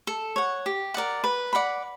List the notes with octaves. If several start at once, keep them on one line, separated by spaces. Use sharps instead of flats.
A4
C#5 F#5
G4
A#4 D5 F#5
B4
D5 F#5 B5